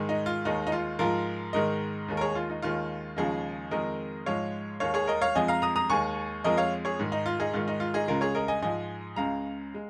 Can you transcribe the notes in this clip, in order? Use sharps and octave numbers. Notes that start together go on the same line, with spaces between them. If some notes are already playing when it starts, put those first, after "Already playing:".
Already playing: G#2 D#3 G#3
D#4
F4
D#2 D#3 G#3 D#4
D#4
F4
G#2 F3 G#3 F4 A#4
G#2 D#3 G#3 A#4 D#5
D#2 D#3 G#3
A#4
G#4 C#5
F4
D#4
D#2 D#3 G#3 F4
D#2 C#3 F3 G#3 D#4 G#4
F2 D#3 G#3 A#4 D#5
G#2 F3 G#3 C#5 F5
D#2 D#3 G#3 C#5 F5
G#4 C#5
A#4 D#5
C#5 F5
F2 F3 G#3 D#5 G#5
F5 A#5
A#5 D#6
A#5 D#6
D#2 D#3 G#3 G#5 C#6
F2 F3 G#3 A#4 D#5
C#5 F5
G#4 C#5
G#2 D#3 G#3
D#4
F4
D#4 G#4
G#2 D#3 G#3 F4
D#4
F4
D#4 G#4
C#2 C#3 G#3 F4 A#4
G#4 C#5
A#4 D#5
D#5 G#5
G#2 F3 G#3 D#5 G#5
C#2 C#3 G#3 F5 A#5
G#3